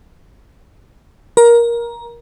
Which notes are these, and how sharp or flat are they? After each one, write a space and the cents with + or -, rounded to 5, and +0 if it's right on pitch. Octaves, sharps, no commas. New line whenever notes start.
A#4 +15